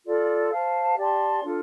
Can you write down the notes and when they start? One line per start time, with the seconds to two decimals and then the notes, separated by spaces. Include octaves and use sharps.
0.05 F4 A4 D5
0.51 C5 F5 A5
0.97 G4 D5 A5 C6
1.42 D4 F4 A4